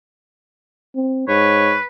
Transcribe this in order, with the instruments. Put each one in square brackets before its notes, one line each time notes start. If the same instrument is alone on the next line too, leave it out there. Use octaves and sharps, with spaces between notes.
[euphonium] C4
[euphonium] G#2 [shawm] B4 [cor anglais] C#5